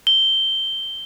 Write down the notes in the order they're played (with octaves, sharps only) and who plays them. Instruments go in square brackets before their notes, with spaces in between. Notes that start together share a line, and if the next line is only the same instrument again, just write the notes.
[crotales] G7